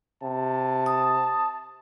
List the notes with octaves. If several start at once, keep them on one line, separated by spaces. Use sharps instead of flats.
C3 A5
D#6